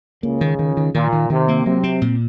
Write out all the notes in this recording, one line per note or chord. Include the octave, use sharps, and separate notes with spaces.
C#2 C#3 A#3
D#3
D#3
D#3
A#2 D#3
D#3
C3 D#3
A#3
C3 F#3
C4
A#2